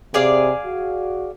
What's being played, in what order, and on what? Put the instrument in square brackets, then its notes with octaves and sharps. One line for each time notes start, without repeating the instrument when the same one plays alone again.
[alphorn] C3 [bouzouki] G#4 D5 F5
[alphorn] F#4